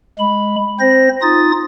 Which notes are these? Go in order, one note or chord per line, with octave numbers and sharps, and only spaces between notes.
G#3 B5
C4 C5 A#6
D#4 F4 D#6 A6